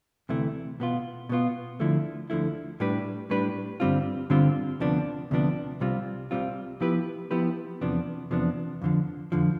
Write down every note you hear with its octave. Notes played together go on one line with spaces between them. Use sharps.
D2 C3 E3 A3 E4
B2 B3 F4
B2 B3 F4
D2 D3 F3 A3 E4
D2 D3 F3 A3 E4
A2 G3 D4 G4 B4
A2 G3 D4 G4 B4
G2 D3 G3 C4 F4
G2 D3 G3 C4 F4
D2 C3 F3 B3 D4
D2 C3 F3 B3 D4
C2 C3 G3 C4 F4
C2 C3 G3 C4 F4
F3 B3 E4 G4 B4
F3 B3 E4 G4 B4
E2 C3 F3 B3 D4
E2 C3 F3 B3 D4
F2 D3 F3
F2 D3 F3